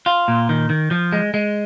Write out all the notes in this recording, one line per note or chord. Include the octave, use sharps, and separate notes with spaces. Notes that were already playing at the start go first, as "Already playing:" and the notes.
F4
A#2
D#3
D#3
F3
G#3
G#3